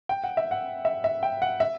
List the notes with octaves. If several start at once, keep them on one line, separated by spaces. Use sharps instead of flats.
G5
F#5
E5
F#5
E5
E5
G5
F#5
E5